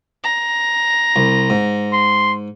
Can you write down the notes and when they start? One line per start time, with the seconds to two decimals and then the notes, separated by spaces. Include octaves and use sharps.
0.24 A#5
1.16 C2
1.50 G#2
1.93 C6